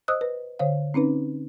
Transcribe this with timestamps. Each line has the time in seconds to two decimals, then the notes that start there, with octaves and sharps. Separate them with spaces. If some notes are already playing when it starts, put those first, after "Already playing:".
0.08 C5 D#5 D#6 E6 F#6
0.21 B4
0.59 D3 C5 C#5 F5
0.94 C4 C#4 D#4 B4